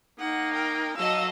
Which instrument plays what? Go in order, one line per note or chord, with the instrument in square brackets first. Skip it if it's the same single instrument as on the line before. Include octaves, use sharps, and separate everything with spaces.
[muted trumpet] A#3 [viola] D#4 [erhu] F#5
[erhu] A#4 [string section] G5
[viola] F#3 [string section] A4 D#5 F5 [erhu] E6